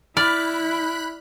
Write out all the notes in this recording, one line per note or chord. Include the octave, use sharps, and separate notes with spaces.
E4 D5 B5 F6 F#6